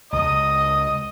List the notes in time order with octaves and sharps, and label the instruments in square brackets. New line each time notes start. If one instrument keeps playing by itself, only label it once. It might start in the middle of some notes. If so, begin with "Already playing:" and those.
[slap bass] C#2 [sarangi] D#5 [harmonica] D#6